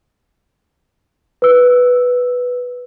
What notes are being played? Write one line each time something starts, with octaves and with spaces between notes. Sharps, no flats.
B4 E6